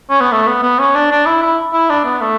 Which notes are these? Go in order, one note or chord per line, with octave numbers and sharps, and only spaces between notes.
C#4
B3
A3
B3
B3
C#4
D4
D4
E4
E4
E4
D4
B3
A3